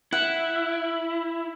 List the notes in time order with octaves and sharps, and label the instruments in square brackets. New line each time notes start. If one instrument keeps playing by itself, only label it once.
[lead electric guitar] E4 [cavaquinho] F#5